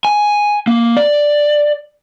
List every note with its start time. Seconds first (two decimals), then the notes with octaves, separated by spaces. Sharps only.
0.05 G#5
0.67 A#3
0.97 D5